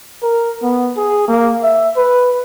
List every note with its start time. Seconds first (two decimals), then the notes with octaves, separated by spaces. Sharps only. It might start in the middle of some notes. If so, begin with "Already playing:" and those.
0.23 A#4
0.63 B3
0.97 G#4
1.28 A#3
1.63 E5
1.97 B4